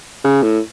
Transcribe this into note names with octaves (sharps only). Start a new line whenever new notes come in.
C#3
A2